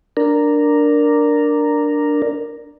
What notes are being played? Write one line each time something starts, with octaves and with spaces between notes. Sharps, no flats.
D4 A#4